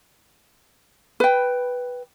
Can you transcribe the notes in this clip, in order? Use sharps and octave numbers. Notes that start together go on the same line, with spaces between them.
B4 G5